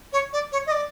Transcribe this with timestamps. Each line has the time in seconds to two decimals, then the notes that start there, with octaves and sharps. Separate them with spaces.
0.13 C#5
0.33 D5
0.52 C#5
0.67 D#5
0.72 D5